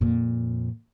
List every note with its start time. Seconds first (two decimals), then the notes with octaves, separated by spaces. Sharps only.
0.01 F2 A#2